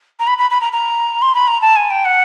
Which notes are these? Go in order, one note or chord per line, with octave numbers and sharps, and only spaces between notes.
A#5
B5
B5
B5
A#5
A#5
C6
B5
A#5
A5
G#5
G5
F#5